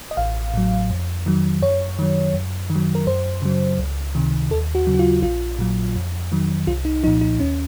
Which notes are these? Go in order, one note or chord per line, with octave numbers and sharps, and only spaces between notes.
D#5
A1 F5
A2 F#3
F2
D#3 F#3
F#2 C#5
D#3 F#3
F#2
D#3
F#3
A#4
F#2 C5
C#3 F#3
C#2
C3 D#3
D#2 A4
F#4
C#3 F#3
F#4
F4
A#1 F4
A#2 F#3
F2
D#3 F#3
C2 F4
D#4
A#2 F3 D#4
D#4
D#2 C#4